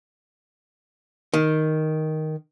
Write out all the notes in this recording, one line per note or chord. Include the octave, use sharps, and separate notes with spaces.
D#3